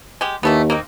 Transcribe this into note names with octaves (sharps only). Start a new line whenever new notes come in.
G#3 G4
D#2 E3 A3 B3
A#3 C4 D#4